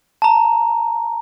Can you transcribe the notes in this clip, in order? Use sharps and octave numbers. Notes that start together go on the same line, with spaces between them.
A5 A#5